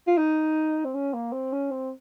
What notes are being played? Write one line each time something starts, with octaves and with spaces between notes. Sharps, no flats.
F4
D#4
C4
C#4
A#3
C4
C#4
C4